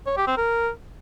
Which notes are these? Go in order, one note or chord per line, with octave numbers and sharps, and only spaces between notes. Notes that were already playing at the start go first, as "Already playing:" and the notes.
C#5
G4
C4
A#4